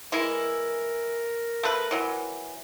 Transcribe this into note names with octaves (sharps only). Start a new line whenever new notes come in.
E3 G#3 E4 A#4
A3 B4
E3 F#3